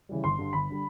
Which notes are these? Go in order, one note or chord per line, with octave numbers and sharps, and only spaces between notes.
C#3 E3 G3
G1 C6
G2 D3 G3
G1 B5
D3 G3